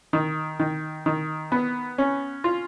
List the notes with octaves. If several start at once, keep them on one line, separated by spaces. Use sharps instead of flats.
D#3
D#3
D#3
B3
C#4
F4